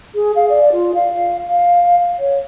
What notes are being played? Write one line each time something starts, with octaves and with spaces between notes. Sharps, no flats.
G#4
F5
D5
F4
F5
F5
C#5